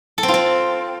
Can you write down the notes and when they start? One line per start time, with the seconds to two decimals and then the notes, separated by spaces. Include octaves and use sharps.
0.18 A4
0.23 C4
0.28 F4
0.34 C4